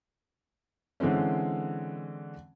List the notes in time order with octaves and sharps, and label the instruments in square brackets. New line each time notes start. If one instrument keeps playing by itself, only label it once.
[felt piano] D3 E3 G#3 C4 C#4